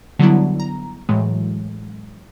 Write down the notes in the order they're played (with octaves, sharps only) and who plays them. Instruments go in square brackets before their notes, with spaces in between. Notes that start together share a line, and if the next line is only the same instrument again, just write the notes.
[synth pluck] D3 F#3 G3 B3 E4
A#5
A2 E3 F#3 G#3